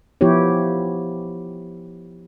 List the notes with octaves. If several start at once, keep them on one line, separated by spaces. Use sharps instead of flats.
F3 B3 E4 G4 C#5